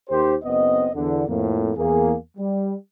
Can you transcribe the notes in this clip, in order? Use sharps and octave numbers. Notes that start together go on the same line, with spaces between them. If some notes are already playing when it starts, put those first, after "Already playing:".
D#2 D#3 G4 C5
F#1 B3 C4 D#5
E2 D3
F2 A2 A#3
E2 A#3 G#4
G3